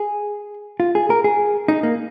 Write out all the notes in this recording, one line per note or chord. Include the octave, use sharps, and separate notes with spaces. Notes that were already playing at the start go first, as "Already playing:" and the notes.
Already playing: G#4
F4
G#4
A#4
G#4
D#4
A#3